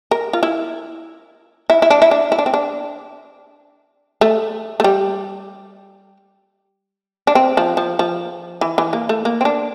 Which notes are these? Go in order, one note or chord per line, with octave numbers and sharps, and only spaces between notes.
A#4
F4
E4
E4
E4
D4
E4
D4
E4
D4
C4
D4
A3
A3
G3
D4
C4
F3
F3
F3
E3
E3
A#3
A3
A#3
C4
D4